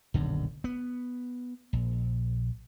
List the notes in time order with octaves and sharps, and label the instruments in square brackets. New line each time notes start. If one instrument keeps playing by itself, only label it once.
[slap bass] D#1 B1 F#2 D3
B3
A#1